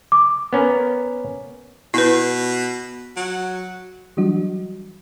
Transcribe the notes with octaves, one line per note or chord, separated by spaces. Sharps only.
D6
B3 C#4 A#4
B2 E4 B4
F#3
E3 F#3 G3 D4 F#4 D#5